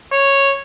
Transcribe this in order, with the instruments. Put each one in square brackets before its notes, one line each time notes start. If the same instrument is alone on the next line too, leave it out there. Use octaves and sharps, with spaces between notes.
[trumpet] C#5